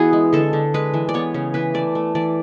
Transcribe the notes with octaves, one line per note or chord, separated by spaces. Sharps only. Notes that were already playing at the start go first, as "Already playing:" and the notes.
Already playing: E3 B3 E4 F#4 G#4
G#3
D3 A4
D3
G#3 B4
E3
D5
B3 C#5
C#3
E3 B4
A3 D5
A3
E3 D5